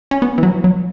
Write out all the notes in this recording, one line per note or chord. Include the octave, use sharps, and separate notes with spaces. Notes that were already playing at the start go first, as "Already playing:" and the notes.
C#4
B3
E3
F#3
F#3